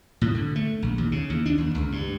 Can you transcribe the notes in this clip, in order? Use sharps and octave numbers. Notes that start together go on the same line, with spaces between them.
A2
D3
A3
A#1
D#2
C#3
D#2
D4
D#2
C#2
G2